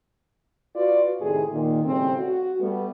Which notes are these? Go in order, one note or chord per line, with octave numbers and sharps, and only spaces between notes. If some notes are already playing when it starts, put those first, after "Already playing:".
F4 F#4 B4 D5
A2 C3 D#3 E4 G#4
A#2 D#3
A2 C#3 G3 C4
F#4
G3 A3 B3